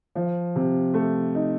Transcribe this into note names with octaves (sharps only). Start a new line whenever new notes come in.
F3
C3
A3
D#4